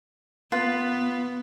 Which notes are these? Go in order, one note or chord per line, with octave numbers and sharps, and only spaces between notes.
B3 F4 B4